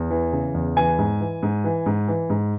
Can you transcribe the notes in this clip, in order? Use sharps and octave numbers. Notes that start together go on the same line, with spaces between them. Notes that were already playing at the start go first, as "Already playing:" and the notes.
Already playing: E2
E3
C#3
E2
E3 G#5
G#2
E3
G#2
E3
G#2
E3
G#2